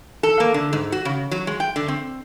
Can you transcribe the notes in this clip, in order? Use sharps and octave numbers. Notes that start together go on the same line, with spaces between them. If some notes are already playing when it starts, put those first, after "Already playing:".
A4
A#3
D3
G#2
F#4
C#3
F#3
G#3
G5
D3
C4